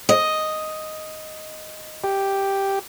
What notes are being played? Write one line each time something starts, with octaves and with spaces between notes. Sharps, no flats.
D#5
G4